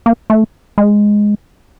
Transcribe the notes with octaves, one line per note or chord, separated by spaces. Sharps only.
A#3
A3
G#3